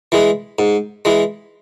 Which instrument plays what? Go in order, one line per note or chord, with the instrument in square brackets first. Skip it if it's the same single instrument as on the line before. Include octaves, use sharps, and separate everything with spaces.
[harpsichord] E3 G#3
G#2
E3 G#3